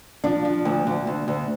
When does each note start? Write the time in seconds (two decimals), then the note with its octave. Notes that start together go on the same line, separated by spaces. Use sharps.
0.24 F3 D4
0.45 F3
0.65 D2
0.87 D2
1.07 D2
1.28 D2